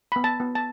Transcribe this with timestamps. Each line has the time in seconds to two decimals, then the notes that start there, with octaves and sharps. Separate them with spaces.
0.12 B3 B5
0.24 A5
0.40 B3
0.55 A5